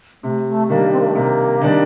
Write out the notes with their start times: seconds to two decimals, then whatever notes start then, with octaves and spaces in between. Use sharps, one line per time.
0.23 C3 A3
0.47 A3
0.69 D#3 G3 A#3 D4
0.92 C4
0.99 A#3
1.07 A3
1.14 C3 A#3
1.61 D#3 G3 D4